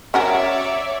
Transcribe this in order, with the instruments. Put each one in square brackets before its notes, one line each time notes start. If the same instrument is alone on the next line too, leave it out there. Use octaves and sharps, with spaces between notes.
[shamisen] C#4 F#4 A#4 [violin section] C#5 D5 E5